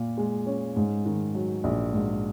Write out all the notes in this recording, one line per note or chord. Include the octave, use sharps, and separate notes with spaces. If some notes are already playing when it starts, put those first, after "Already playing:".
Already playing: A#2 F4
G#3
C#4
G#2
D#3
F#3
A#1
G#2